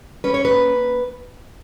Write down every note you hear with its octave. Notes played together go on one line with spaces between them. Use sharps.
C#4 B4
C#5
B4
A#3